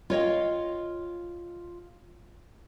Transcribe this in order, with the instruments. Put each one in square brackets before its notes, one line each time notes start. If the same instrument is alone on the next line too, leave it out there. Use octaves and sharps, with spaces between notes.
[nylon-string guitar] F4 C#5 D#5 G5